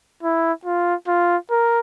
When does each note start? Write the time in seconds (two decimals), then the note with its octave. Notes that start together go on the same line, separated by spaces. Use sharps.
0.23 E4
0.65 F4
1.07 F4
1.50 A#4